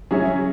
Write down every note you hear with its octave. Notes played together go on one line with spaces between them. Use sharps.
F#3 C#4 G#4 C#5 E5